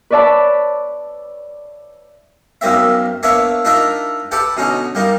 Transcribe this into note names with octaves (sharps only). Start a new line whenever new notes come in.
B4 C#5 D5 E5 A5 B5
B1 F#2 A#3 C4 E5
A#3 B3 D4 C#5 D5 E5
D4 D#4 F4 A#4 E5
G4 A4 B4 D5 F#5
B2 D3 C#4 D#4
G3 A#3 D#4